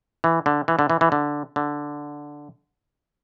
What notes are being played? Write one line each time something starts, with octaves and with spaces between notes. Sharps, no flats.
E3
D3
E3
D3
E3
E3
D3
D3